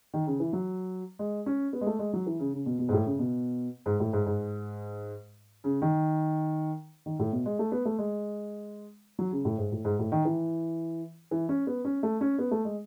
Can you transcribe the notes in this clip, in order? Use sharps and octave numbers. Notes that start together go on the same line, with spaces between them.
D#3
C#3
E3
F#3
G#3
C#4
B3
G#3
A3
G#3
F#3
E3
C#3
C#3
B2
B2
G#2
A2
C#3
B2
G#2
A2
G#2
G#2
C#3
D#3
D#3
A2
B2
G#3
A3
B3
A3
G#3
F#3
C#3
A2
G#2
A2
G#2
A2
D#3
E3
E3
C#4
B3
C#4
A3
C#4
B3
A3
G#3